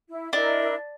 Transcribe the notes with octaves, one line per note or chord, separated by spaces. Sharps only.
E4
D4 E4 A#4 D#5